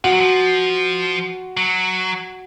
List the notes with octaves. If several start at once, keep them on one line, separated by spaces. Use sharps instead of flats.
F3 F#4
F#3
F3
F#3